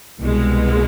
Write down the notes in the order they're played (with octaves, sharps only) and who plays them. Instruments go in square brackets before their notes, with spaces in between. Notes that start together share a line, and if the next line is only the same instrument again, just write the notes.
[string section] C2 B2 G#3